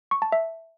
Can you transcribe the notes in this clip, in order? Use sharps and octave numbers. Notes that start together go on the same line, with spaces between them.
C#6
A5
E5